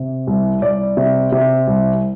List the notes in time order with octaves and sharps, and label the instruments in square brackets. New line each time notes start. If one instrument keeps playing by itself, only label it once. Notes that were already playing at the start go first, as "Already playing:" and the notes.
Already playing: [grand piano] C3
C2
C2 D5
C3
C3
C2